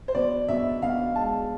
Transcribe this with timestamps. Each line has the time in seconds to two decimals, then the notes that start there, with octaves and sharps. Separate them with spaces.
0.08 C5
0.15 B2 D5
0.48 B2 E5
0.82 B2 F5
1.15 G#3 A5